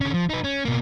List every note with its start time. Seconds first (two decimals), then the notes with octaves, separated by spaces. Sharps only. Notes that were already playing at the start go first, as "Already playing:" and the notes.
0.01 D3 C#4
0.14 F3
0.29 D#4 B4
0.44 C#4
0.65 B2 A#3